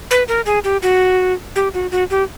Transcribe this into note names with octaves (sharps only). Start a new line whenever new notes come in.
B4
A#4
G#4
G4
F#4
G4
F#4
F#4
G4